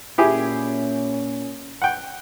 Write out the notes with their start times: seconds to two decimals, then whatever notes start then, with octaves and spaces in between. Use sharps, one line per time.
0.18 A#2 C#4 E4 G4 G#4
1.82 F#5 G5